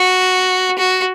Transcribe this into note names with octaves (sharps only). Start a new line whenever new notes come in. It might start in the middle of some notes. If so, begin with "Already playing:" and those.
Already playing: F#4
F#4